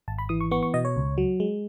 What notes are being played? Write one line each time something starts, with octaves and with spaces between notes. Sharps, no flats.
G#1 A5
B5
E3 D#6
C#6
B3 C#6
C#6
B2 D#5
C#5
C#2
F#3
G#3